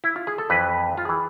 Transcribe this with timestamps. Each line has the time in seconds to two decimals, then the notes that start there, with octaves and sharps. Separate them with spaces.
0.04 E4
0.16 F4
0.27 G#4
0.38 A4
0.50 F2 E3 B4
0.97 F4
1.05 E3 G#4